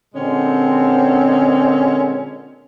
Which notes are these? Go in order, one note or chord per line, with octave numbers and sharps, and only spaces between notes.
A#2 D3 G#3 C4 C#4